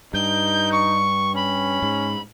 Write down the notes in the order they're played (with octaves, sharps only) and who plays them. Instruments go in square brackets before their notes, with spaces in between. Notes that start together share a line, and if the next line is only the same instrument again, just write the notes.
[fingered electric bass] G2 [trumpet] D#4 [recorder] G6
[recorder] C#6
[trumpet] C#4 [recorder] B5
[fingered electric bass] G#2